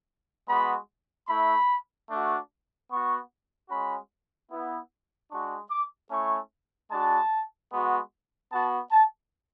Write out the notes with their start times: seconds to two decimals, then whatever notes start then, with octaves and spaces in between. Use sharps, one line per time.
0.47 G#3 B3 F#4 B5
1.27 A3 E4 B5
2.08 A3 D4 F#4
2.89 B3 F#4 C#6
3.69 G#3 C#4 F#4 B5
4.49 B3 E4
5.29 G#3 D4 F#4 C#6
5.70 D6
6.10 A3 C#4 E4 C#6
6.90 G#3 D4 F#4 A5
7.70 G#3 B3 F#4
8.51 B3 F#4 A5
8.91 A5